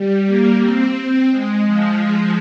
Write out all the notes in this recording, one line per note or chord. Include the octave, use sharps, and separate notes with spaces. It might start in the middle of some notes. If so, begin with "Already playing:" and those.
Already playing: G3
A#3
C4
G#3
F3